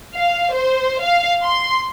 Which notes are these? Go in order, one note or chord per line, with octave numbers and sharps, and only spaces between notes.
F5
C5
F5
C6